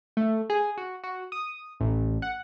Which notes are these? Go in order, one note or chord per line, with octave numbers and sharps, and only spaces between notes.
A3
G#4
F#4
F#4
D#6
A1
F#5